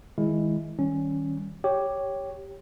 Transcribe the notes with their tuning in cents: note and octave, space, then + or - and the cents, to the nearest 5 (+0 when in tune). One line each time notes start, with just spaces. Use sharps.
D#3 +25 G#3 -5 E4 +0
D#3 +25 G3 +0 C#4 +0
G4 +0 C#5 +0